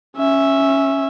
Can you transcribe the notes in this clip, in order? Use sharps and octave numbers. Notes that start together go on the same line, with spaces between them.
C#4 E5